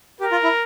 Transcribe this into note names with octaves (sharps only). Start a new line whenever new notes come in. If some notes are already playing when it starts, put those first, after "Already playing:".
G4 A#4
F4
E4